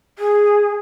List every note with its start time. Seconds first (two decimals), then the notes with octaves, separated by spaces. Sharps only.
0.18 G#4